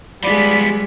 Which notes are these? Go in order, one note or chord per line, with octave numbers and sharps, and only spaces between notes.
F3 G3 G#3 B3 D5 B5